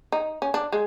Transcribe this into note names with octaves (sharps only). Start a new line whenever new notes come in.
D#4
C#4
D4
G#3